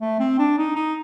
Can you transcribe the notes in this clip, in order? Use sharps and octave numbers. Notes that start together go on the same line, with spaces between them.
A3
C4
D4
D#4
D#4